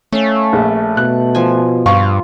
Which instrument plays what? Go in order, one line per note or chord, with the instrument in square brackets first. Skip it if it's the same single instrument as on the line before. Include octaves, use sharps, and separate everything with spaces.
[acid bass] A3 [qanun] C#4 F5
[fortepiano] A#1
[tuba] B2 [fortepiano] F#6
[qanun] F3 G#5
[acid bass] G2 [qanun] F4 [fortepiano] F5 C#6